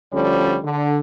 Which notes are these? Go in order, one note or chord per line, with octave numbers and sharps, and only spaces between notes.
D2 D3 F3 G3 C#4 C#5
D3